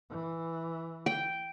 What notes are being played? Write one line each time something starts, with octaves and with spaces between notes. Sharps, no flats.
E3
G5